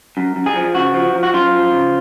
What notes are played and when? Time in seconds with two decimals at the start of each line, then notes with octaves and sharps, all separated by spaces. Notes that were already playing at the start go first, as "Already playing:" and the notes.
0.17 F#2
0.36 F#2
0.46 G#4
0.55 F3
0.75 C#3 F#4
0.94 F3
1.14 F3
1.23 F#4
1.34 F#2 F4
1.53 F3
1.72 C#3